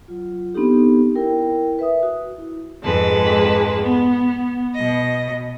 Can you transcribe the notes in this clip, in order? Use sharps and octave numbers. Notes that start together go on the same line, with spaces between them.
F#3 F4
B3 C4 D4 D#4 G4 A4
E4 A#4 G5
B4 E5 D#6
F#4
E4
F2 G#2 G#3 B4 A5
B3
B2 D#5